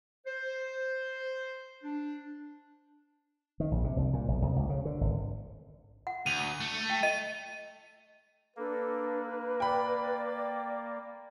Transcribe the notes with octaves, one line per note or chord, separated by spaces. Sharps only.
C5
D4
D#3
A#1
C3
C2
A#2
B1
C2
C#2
C#3
D3
G#1
F#5
D2 D#7 F7
A3
G5
D#5 D#7
A#3 D4 A4 B4
D5 G5 B5 D6